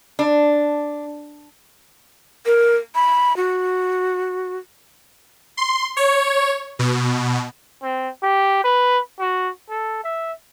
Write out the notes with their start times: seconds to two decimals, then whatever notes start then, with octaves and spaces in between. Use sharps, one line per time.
0.19 D4
2.46 A#4
2.95 B5
3.37 F#4
5.57 C6
5.97 C#5
6.79 B2
7.82 C4
8.23 G4
8.64 B4
9.19 F#4
9.70 A4
10.03 E5